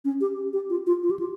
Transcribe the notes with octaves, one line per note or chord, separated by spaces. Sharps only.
C#4
G4
G4
F4
F4
F4
G4
F4